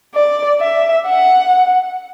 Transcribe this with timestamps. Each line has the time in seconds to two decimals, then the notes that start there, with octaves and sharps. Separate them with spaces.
0.14 D5
0.60 E5
1.07 F#5